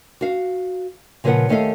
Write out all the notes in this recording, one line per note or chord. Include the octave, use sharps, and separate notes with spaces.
F#4 F5
A#2 C#3 F3 G#4 B4 F#5
D#2 A3 C#4 A4 D#5 F5